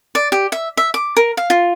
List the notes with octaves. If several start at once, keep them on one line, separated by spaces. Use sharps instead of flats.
D5
G4
E5
E5
D6
A#4
F5
F4